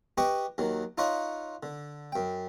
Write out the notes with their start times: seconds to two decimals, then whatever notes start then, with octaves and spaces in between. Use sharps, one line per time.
0.18 G4 B4 D#5 G5 C#6 D#6
0.58 D#2 D#3 F#3
0.98 D#4 F4 C#5 D#5 F#5 B5
1.63 D3
2.12 F#2 G5